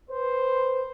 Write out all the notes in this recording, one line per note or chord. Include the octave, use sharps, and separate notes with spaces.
B4 C5